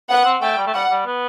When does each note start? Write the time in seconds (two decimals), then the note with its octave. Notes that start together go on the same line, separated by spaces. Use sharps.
0.10 B3 F#5
0.25 C4
0.42 A3 G5
0.58 G3
0.67 A3
0.74 G3 F#5
0.91 G3
1.06 B3